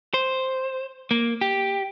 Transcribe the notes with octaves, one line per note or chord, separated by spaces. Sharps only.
C5
A#3
G4